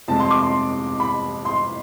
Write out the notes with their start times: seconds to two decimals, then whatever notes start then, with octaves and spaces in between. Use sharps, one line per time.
0.08 F2 C3 G#3 A5
0.20 C6
0.31 D6
0.43 C6
1.00 B5
1.45 C6